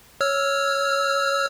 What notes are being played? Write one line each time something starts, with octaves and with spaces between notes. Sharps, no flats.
C#5 E6 F6